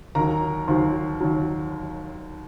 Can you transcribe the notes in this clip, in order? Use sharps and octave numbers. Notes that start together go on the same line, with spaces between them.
D#2 D#3 F#3 A#4 A#5
D#2 D#3 F#3 C5 C6
D#2 D#3 F#3